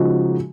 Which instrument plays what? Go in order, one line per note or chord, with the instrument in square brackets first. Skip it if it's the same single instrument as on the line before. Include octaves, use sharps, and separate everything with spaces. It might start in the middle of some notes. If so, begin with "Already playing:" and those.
Already playing: [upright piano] C#3 F3 G#3 D#4 F#4